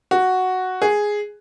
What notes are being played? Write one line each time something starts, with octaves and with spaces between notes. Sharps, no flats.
F#4
G#4